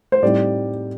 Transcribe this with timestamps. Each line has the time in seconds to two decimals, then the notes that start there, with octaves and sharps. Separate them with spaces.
0.12 C5
0.22 A2 G3 C4 D#4 D5